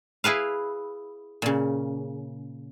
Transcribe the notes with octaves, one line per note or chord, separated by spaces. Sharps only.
E4 G#4 B4 F5
A#2 C#3